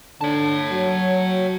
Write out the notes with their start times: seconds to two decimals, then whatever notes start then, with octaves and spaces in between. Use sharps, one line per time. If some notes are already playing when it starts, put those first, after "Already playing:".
0.21 D3 C#5 A5
0.72 F#3